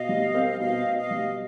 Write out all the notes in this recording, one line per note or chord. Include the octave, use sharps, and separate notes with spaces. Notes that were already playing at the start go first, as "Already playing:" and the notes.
Already playing: B2 D#5 F5
G3
C4
B2 D#5 F5
B2
D#5 F5
G3